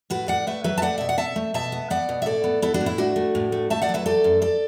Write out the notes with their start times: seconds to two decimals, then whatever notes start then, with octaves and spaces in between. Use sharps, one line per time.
0.10 A2 F#4 B4
0.28 A2 D5 F#5
0.47 A3 B4 E5
0.64 F#3 B4 E5
0.78 A5
0.82 A3 D5 F#5
0.98 B2 E5
1.09 F#5
1.18 B2 E5 A5
1.36 A3
1.54 B2 E5 A5
1.72 B3
1.90 B3 D5 F#5
2.09 B2
2.22 E5
2.26 A2 A4 D5
2.44 B3
2.62 B3 E4 A4
2.74 D4 F#4
2.81 A2
2.86 E4
2.98 A3 D4 F#4
3.16 A3
3.35 A2
3.52 A3
3.70 A3 E5 A5
3.82 D5 F#5
3.89 F#3
3.94 B4 E5
4.06 A3 A4 D5
4.24 F#2
4.42 A4 D5